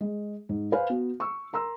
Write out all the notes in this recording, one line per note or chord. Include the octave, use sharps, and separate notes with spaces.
G#3
G#2
B4 C5 F5 G#5
B3 F#4
C#6 E6
A#4 A#5 C6 E6